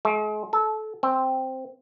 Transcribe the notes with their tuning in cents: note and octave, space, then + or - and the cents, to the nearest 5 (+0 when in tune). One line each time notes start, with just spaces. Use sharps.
G#3 +40
A4 -20
C4 +0